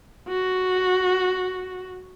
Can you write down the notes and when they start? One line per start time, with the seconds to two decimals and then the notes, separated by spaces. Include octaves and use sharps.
0.29 F#4